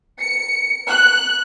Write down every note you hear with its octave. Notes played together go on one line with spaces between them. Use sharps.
C#7
F#6